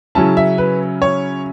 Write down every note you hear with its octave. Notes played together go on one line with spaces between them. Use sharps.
C#3 F#3 C#4 E4 A5
E5
B4
C#5